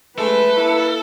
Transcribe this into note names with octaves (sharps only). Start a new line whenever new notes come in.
G#3 A3 A4 B4
A#3 E4